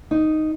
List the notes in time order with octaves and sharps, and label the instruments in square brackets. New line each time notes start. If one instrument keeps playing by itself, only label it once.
[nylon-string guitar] D#4